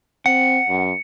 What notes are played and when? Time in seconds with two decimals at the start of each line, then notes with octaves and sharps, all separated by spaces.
0.26 C4 F#5 C#7
0.69 F#2